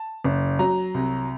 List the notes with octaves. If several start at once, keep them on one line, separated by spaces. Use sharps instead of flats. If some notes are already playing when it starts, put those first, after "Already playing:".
Already playing: A5
F#1
F#3 A#5
C2